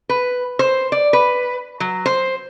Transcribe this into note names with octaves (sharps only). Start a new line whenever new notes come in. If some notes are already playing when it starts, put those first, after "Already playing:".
B4
C5
D5
B4
F#3
C5